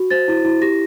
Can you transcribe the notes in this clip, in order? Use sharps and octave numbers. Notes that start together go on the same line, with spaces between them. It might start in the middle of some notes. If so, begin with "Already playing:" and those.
Already playing: F#4
C5 A6
E4
E4
G4 A#6